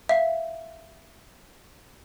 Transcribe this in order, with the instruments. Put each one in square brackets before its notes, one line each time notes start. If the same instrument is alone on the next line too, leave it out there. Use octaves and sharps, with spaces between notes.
[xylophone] E5 F5